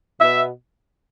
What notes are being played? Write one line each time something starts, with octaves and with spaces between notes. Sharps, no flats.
B2 B3 E5